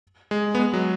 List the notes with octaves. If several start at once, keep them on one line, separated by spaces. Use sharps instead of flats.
G#3
B3
G#3
F#3